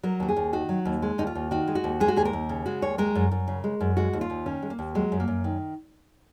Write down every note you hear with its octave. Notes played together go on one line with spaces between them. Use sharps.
F#3 A#4
D#2 F#4
G#4
D#2
D#3 F#4
F#3
D#2
G#3
D#2 D#4
F4
D#2
D#3 F#4
G#3
F#4
D#2
G#3 G#4
F#4
D#2 G#4
A#4
D#2
C#3
G#3 F#4
D#2 C#5
G#3 A#4
F#2
F#2
C#3
G#3
F#2
G#3 F#4
D#2
F4
D#2
D#3 C#4
G#3
A#3
D#2
F#3 G#3
F#2
A#3
F#2
D#3